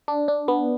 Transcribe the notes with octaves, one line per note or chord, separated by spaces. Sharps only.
D4
D4
B3